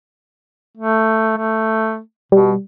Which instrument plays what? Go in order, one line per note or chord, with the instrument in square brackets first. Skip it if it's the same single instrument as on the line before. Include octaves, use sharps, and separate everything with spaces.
[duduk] A3
A3
[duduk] B2 [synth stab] G3